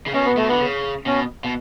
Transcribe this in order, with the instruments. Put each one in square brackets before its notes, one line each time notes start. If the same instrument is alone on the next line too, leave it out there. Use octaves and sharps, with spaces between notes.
[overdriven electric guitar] C#3
[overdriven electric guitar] B2 [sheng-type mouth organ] C#4
[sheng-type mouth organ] B3
[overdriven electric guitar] B2 [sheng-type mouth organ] A3
[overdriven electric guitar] D3 [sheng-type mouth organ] B3
[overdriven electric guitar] C#3
[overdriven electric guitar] B2 [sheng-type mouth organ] C#4
[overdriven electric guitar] B2